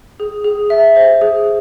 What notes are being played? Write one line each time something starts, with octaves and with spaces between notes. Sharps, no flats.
G#4
G#4
E5
C5
G#4